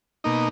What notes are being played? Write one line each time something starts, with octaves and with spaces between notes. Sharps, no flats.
B2 A#3 D#4